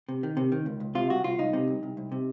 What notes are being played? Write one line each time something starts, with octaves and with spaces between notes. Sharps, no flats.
C3
D#3
C3
D#3
C#2
C#2
C3 F4
C2 F#4
C2 F4
C2 D#4
C3
C2
C2
C2
C3